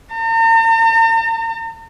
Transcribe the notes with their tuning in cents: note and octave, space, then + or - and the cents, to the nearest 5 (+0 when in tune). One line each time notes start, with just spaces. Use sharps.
A#5 -45